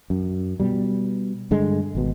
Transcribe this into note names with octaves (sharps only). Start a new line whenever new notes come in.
F#2
B2 G3
G2 D3 G#3
G#1 B2